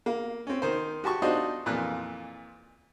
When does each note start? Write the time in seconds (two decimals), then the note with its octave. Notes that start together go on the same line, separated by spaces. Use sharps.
0.06 A#3
0.47 C4 C#4
0.62 D#3 C5
1.04 F#4 G4 A5 C#6
1.22 D4 D#4 F4 F#4 C5 D#5
1.66 F2 A#2 E3 F#6